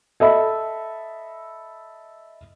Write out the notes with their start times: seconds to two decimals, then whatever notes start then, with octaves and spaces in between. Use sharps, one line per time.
0.20 A4 D#5 E5 B5